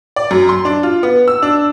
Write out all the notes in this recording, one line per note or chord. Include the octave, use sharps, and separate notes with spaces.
D5
F#2
C6
D4
F4
B3
E6
D4